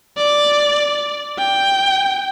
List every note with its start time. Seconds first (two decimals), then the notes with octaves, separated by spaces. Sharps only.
0.17 D5
1.38 G5